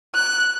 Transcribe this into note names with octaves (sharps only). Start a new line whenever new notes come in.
F#6